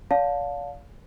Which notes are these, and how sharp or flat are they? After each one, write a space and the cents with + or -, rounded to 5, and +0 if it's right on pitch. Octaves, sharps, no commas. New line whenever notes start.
D5 -45 F5 +20 A5 +0